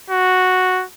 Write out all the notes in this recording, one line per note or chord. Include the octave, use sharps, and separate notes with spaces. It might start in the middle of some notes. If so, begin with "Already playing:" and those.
F#4